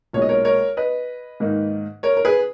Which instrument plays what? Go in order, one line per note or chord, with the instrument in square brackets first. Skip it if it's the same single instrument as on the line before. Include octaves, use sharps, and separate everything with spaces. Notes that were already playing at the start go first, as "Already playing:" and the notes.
[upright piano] B1 A#2 G#3 C#5
D#5
A#4 C#5
A#4 C#5
B4 D#5
G#2 D#3 A#3 D#4
A#4 C#5
A#4
G#4 B4